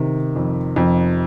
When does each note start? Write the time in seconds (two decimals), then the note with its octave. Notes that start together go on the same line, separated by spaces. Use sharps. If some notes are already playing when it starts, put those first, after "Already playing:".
Already playing: C3 D#3
0.36 F2
0.76 F2